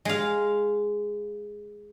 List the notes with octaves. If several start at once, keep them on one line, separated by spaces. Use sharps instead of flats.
G#3 F5